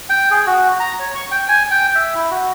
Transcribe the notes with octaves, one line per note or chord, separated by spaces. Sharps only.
G5
G#4
F#4
A#5
C#5
C#6
G5
G#5
G5
E5
E4
F#4